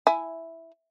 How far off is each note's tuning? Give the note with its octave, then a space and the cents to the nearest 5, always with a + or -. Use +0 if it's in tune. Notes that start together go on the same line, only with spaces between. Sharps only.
E4 +0 G#5 +0